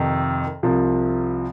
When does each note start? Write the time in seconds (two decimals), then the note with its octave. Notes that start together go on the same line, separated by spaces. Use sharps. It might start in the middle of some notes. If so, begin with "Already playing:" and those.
Already playing: F2 C3 D#3
0.63 C2 C3 F3